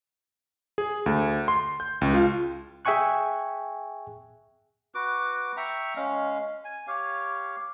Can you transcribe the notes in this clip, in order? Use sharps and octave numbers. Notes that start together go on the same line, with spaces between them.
G#4
D2
C6
G6
C#2
F4
G#4 E5 G5 G#5 C#6 F#6
F#4 B4 D6
E5 G5 A#5 C#6
G#3 C#4 F5
G#5
G4 C#5 F5